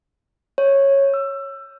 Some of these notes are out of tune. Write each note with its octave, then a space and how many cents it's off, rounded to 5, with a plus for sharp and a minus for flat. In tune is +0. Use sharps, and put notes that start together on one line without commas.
C#5 -10
E6 +25